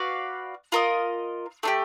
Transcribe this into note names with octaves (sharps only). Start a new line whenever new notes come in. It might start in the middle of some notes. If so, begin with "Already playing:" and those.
Already playing: F#4 B4 D5 F5
F4 A#4 D#5
A3 D4 G4